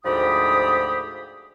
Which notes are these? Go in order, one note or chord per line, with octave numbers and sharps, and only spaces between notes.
D2 G#2 F3 G4 B5 D#6